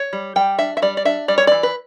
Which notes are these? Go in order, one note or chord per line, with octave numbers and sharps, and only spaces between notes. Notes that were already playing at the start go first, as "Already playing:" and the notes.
Already playing: C#5
G3
G3 G5
D4 E5
E5
G3 D5
D5
D4 E5
G3 D5
C#5
E3 D5
B4